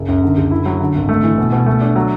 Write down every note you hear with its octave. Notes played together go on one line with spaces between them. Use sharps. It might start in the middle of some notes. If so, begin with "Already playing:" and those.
Already playing: F#1
F#2
D3
F#1
E4
F#3
D3
G#1
A3
E3
B2
B2
A3
D4
F#3